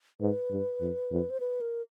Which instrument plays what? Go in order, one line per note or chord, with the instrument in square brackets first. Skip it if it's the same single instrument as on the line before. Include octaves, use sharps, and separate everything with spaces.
[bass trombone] G#2 [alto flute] B4
[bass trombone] G2
F2
F2
[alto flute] C5
B4
A#4